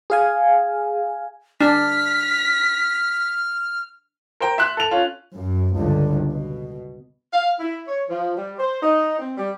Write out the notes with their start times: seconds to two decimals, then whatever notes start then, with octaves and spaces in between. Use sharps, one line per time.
0.10 G#4 F5 G#5
1.61 D4 F6 B6
4.40 A#4 C5 G5 A#5
4.58 E5 C6 F#6
4.77 A4 F7
4.91 C#4 F4
5.35 F#2
5.75 G1 C#2 D3
6.31 B2
7.33 F5
7.60 E4
7.87 C#5
8.08 F3
8.36 G3
8.59 C5
8.82 D#4
9.19 C4
9.38 G3